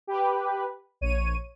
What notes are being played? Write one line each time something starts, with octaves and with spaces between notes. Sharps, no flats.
G4 B4
A#1 C#5 D#7